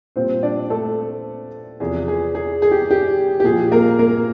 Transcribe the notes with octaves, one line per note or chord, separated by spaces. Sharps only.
A#2 G3 C4 C5
D4 D5
A3 A4
E2 C3 F3 G#4
G#4
G#4
G#4
G4
G4
G4
A#2 F3 G#4
A#3 A#4
A#3 A#4